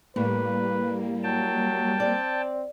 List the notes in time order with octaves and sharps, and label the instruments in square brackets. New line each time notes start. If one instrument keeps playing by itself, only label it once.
[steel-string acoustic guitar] A2 [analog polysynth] G3 A#3 [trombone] B4
[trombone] F#3 [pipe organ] G5 A5
[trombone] C4 [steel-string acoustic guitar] D5